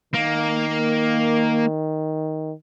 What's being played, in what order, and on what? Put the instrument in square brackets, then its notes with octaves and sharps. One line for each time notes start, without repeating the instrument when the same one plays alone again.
[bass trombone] D#3 [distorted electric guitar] A#3